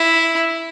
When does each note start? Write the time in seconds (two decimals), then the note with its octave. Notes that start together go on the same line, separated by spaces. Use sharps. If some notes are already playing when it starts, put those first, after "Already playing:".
Already playing: E4